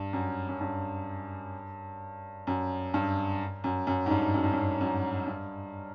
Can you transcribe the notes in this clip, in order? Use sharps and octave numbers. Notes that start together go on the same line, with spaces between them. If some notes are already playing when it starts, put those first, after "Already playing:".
Already playing: G2
F#2
F#2
G2
F#2
G2
F#2
F#2
G#2
G2
F#2
G2
F#2
F#2
G2